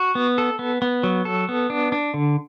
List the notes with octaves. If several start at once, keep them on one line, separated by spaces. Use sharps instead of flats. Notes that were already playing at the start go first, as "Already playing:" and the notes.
Already playing: F#4
B3
A4
B3
B3
F#3
A4
B3
D4
D4
D3